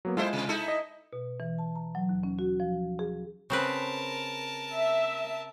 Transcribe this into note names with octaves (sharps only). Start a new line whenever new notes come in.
F#3 A#3 B3
G#3 E4 F4 A4 C5
C3
D#4 E4 A4
D#5
B2
E3
A5
A#5
F#3
D#2
C#4
F#4
F3
G#4
C#3 C4 A#4 B4 A5
E5